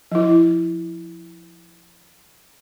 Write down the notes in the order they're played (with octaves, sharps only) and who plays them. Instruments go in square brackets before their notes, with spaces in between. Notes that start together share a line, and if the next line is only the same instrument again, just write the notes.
[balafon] F3 E4